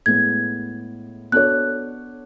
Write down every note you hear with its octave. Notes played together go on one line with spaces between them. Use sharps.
A2 G#3 B3 G#6
B3 D4 F#4 A4 C#5 F#6